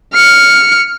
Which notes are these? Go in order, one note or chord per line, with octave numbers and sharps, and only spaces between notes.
F6 C#7